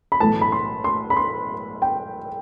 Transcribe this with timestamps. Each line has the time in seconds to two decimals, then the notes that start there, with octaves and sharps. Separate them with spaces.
0.12 B5
0.20 B1 A2 E3 A3 A5
0.42 B5
0.52 C6
0.84 C6
1.10 B5
1.16 C6
1.82 G5